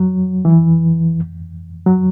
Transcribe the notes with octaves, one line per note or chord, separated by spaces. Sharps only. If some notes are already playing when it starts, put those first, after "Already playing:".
Already playing: F#3
E3
F#3